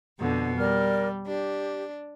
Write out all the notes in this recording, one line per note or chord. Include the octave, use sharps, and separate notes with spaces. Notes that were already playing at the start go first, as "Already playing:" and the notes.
F2 B2 D3
G3 A#4 D5 F6
D4 G4